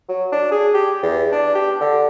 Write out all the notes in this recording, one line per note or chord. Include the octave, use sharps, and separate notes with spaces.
F#3
D4
G#4
G4
E2
D4
G4
D3